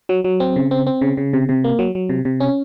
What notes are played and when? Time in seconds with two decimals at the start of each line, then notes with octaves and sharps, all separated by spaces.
0.09 F#3
0.24 F#3
0.40 C4
0.56 C#3
0.71 C4
0.87 C4
1.01 C#3
1.17 C#3
1.33 C3
1.49 C3
1.64 A#3
1.79 F#3
1.95 F#3
2.09 C3
2.25 C3
2.40 C#4